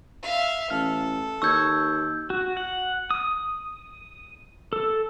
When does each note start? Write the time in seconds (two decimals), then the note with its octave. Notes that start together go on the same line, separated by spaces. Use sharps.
0.22 E5 F5
0.70 A1 A4 F6
1.42 D#2 C#6 E6 G6 G#6
2.30 F#4
2.57 F#5
3.11 D#6
4.73 A4